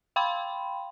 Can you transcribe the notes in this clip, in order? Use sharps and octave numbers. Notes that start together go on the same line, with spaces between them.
F5 G5 B5 C6